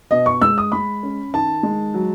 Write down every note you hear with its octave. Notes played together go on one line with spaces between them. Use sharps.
B2 D#5
C#6
G#3 E6
D#6
G#3 B5
C#4
D#3 A5
G#3
F#3